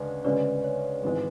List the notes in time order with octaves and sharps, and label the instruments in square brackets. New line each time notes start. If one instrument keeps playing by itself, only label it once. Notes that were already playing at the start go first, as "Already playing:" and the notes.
Already playing: [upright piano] D2 C#3 G#3 D4 [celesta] B4 D5
[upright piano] D2 C#3 G#3 C#4 [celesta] B4 D5
[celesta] C#5
[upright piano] G#1 G#2 E3 G#3 [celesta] B4